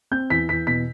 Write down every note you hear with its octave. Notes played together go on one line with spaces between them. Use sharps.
C4 G6
E2 B6
E2 B6
B2 B6